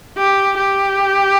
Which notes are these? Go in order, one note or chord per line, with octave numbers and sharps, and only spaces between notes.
G4
G4